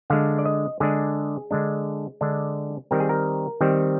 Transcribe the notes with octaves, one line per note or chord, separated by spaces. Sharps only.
D3 G#3 D4 F5
D5
D#5
D3 G#3 D4 G#4
D3 G#3 D4
D3 G#3 D4
D#3 G3 C4 A#4
G#4
A#4
D#3 G3 C4